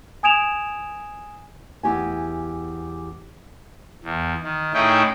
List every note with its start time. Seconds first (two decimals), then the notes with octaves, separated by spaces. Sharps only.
0.23 G#5 D#6 G#6 D7 E7 F7
1.83 E2 G4 G#5
4.04 E2
4.43 D#3
4.74 A2 C#4 D#4 E4 G#4 G5